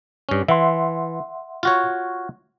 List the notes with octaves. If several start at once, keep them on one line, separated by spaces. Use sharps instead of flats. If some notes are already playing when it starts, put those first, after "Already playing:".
G2 C#4
E3 E5 F#5 C6
F4 F#4 C#5